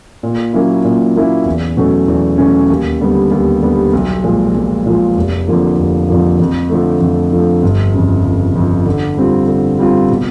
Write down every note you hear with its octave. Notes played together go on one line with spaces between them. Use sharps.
A#2
F#3 A#3 C#4 E4
A#2
F#3 A#3 C#4 E4
E2
B2 F#3 A3 C#4
E2
B2 F#3 A3 C#4
D#2
D3 G3 B3
D#2
D3 G3 B3
B1
A#2 F3 G#3
B1
A#2 F3 G#3
F1
F2 D3 F3 A#3
F1
F2 D3 F3 A#3
F2
D3 F3 A3
F2
D3 F3 A3
G1
F2 C#3
G1
F2 C#3
D3
G3 C4 F4
D3
G3 C4 F4
B2